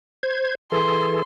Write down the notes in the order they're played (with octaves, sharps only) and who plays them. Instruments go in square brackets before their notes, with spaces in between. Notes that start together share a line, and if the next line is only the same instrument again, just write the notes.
[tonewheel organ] C5 G#6
[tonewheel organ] E3 G#4 A4 [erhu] C6